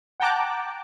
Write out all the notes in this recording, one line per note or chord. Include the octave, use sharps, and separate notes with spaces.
F#5 G5 A5 A#5 D6 F#6